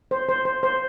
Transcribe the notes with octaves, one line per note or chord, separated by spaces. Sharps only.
C5
C5
C5
C5